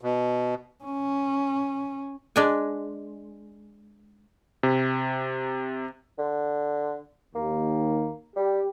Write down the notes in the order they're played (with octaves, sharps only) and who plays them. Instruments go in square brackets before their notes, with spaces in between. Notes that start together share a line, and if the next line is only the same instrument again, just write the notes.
[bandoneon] B2
[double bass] C#4
[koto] G#3 D4 G#5
[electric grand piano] C3
[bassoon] D3
[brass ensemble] D#2 [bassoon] A#3
[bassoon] G3 [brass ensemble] G4